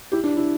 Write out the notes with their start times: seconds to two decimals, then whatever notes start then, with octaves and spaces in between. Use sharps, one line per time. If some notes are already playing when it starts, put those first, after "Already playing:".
0.12 E4 G4
0.24 D4
0.37 E4